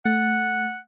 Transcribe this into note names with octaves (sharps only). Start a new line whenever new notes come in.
A3 F#5